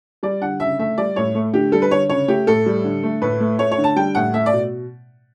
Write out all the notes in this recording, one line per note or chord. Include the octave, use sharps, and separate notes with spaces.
G3 D5
D3 F#5
C#3 E5
A3 E5
G3 D5
A2 C#5
A3
D3 G4
G3 A4
B4
D3 C#5
C#3 C#5
A3 G4
A2 A4
G3
D3
A3
A2 B4
A3
A3 C#5
C#5
D3
A5
G3 G5
A2 F#5
A3 E5
D5
B2